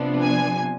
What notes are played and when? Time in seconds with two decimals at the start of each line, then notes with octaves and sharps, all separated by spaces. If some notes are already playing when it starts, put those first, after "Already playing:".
Already playing: C3 F3 B3 D4
0.21 G#5